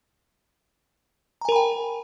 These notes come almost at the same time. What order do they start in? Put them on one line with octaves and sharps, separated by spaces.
A#5 G#5 A#4 B5 G5